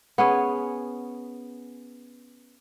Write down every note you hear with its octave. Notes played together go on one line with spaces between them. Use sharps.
B3 C#4 G#4